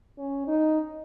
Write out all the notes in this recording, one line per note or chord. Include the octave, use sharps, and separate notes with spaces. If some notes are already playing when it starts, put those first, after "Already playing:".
C#4
D#4